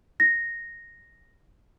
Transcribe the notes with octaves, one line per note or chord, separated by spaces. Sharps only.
A#6